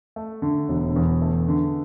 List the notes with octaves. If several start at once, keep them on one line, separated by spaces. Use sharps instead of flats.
A3
D3
E1
E2
A3
D3